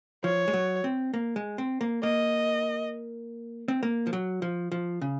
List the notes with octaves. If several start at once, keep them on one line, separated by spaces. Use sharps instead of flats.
F3 C#5
G#3
F#3
C4
A#3
G#3
C4
A#3
A#3 D#5
C4
A#3
F3
F#3
F3
F3
C#3